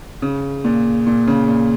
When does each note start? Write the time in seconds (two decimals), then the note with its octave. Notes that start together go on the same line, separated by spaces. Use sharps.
0.22 C#3
0.65 A#2
1.07 A#2
1.27 C#3
1.48 A#2